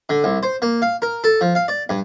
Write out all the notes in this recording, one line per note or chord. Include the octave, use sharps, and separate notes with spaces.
D3
C2
C5
A#3
F5
A#4
A4
F3
F5
D5
G2